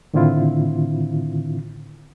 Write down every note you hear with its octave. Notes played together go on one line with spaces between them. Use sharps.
A2 D3 D#3 C4 E4 F4